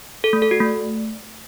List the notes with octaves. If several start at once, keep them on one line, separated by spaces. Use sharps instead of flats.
A4
A3
A4
F#4
A3